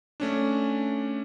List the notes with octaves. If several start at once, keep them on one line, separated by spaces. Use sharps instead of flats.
A3 C#4 D4